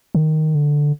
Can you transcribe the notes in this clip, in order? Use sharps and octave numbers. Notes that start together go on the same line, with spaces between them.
D3
D#3
D3